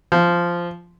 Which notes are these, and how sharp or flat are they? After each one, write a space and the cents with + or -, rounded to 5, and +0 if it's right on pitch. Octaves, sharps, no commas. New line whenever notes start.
F3 -10